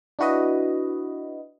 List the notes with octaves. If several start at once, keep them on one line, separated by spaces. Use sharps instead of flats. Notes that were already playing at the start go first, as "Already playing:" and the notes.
D4 E4 F#4 B4 D#5